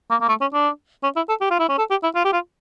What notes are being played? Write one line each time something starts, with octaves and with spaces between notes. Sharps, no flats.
A#3
A#3
A3
C#4
D4
C#4
E4
A4
G4
F4
E4
C#4
A4
G4
E4
F4
G4
F4